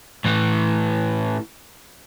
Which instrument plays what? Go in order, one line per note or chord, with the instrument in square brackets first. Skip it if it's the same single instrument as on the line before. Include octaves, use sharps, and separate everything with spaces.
[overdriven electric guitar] A2 E3